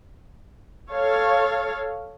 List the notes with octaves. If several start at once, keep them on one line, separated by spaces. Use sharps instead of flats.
A4 C#5 F5